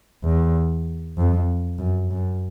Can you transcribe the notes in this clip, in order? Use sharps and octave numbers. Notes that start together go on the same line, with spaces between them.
E2
F2
F#2
F#2